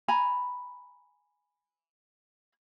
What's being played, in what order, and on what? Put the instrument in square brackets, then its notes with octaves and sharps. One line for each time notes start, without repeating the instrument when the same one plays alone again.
[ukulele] G#5 A#5 B5